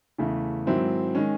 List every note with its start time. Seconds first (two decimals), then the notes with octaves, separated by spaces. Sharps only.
0.18 E2 C#3 E3 A3
0.67 G#2 D#3 F#3 C4 E4
1.15 D#3 G#3 C#4